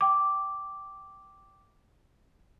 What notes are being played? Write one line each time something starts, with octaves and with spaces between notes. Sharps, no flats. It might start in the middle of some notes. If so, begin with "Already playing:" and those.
G5 D6